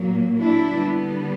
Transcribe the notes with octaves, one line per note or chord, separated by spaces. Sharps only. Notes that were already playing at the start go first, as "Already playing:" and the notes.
Already playing: A#2 F#3 A#3
D4 E4
D3 G3 B3